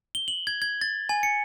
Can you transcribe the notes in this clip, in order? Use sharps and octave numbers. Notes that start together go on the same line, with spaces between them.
G7
F#7
G#6
G#6
A6
G#5
C#7